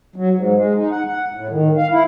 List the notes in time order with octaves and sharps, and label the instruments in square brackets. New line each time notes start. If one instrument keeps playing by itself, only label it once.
[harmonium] F#3
G#2
G#3
D#4
F#5
F#5
A2
D#3
F5
E4